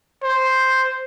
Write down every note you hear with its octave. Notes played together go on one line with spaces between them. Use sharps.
C5